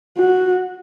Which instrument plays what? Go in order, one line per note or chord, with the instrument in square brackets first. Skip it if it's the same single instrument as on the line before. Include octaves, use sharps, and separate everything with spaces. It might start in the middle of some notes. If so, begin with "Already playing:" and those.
[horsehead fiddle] F#4